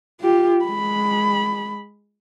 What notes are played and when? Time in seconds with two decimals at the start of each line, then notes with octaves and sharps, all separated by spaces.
0.21 F4 G4
0.65 G#3 B5